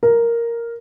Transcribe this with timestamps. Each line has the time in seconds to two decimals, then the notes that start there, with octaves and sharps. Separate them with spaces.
0.03 A#4